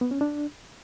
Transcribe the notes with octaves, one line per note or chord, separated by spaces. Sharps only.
B3
C#4
D4